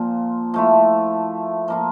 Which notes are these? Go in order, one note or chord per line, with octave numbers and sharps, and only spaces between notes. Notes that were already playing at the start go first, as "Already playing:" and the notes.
Already playing: A#2 F3 C4 F4
F3 A3 E4
F3 A#3 F4